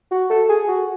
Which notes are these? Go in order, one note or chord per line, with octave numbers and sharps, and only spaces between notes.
F#4
A4
G#4
F#4